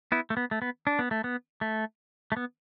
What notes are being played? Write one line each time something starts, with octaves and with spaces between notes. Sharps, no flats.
B3 E4
A3
B3
A3
B3
D4
B3
A3
B3
A3
A3
B3